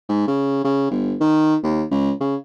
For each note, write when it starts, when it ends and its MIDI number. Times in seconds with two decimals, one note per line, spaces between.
0.09 0.23 44
0.27 0.61 49
0.64 0.86 49
0.91 1.15 31
1.20 1.55 51
1.63 1.83 39
1.91 2.12 37
2.20 2.35 49